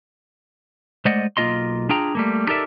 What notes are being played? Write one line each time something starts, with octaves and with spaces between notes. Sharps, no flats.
G#3 A3 C5 D5 D#5 F#5
B1 A#3 E4 F4 D#5 C6
D4 F4 G#4 G5 A#5
G3 A3 A#3
D#4 G4 A4 A#4 D5 E5